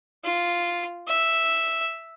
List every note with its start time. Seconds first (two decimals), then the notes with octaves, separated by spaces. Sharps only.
0.24 F4
1.08 E5